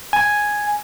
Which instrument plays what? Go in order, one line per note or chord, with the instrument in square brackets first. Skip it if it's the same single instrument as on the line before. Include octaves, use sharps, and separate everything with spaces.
[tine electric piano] G#5